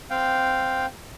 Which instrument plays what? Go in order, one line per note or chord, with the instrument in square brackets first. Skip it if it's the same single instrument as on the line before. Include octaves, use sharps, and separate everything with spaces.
[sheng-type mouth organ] C4 F5 G5